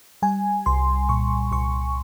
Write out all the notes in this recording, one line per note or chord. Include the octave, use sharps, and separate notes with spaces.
G3 G#5
C2 C6
A#2 C#6
C2 C#6